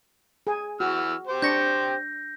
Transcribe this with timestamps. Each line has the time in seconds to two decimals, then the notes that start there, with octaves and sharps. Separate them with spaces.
0.47 G#4 G#5
0.80 E3 F#4 E6 F6
1.27 G4 C5 G5
1.42 D4 C#6 G6 A#6